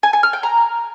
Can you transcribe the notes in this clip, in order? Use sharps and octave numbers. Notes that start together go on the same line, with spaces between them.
G#5
G#5
F6
G5
A#5